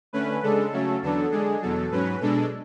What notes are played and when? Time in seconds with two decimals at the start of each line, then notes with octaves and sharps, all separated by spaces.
0.13 D3 A3 C#4 B4
0.43 C#3 G#3 D4 A4
0.72 C#3 F#3 A3 C#4
1.02 E2 D3 F#3 B3 D4 A4
1.31 D3 G#3 D4 G#4
1.62 E2 B2 F#3 A4
1.91 G#2 F#3 C#4 B4
2.21 B2 G#3 D4 A4